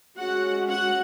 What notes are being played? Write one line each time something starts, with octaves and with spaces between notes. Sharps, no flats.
G#3 C#4 F#4 F#5
F#4 F#5